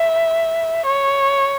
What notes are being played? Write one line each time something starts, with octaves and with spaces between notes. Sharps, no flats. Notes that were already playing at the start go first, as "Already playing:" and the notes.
Already playing: E5
C#5